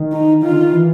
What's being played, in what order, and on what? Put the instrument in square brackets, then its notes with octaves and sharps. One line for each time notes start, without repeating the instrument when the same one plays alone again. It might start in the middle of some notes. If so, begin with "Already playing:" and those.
Already playing: [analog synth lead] D#3
[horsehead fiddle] D#4
[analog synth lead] D#3 [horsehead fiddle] F4
[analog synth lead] D3
D#3
E3